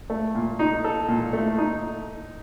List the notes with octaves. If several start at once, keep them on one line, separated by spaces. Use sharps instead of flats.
A3
A#2
D#4
A4
A#2
A3
D#4